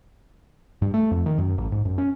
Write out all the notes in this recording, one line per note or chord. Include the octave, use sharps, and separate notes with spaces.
G2
A3
F2
D#3
F#2
A1
G#2
F#2
C#4